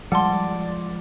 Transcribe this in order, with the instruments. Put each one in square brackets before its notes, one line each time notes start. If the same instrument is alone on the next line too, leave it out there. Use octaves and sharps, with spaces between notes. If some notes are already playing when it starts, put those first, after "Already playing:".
[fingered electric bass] F3 G#3 [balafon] G3 [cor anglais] D5 [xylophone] F#5 A5 C6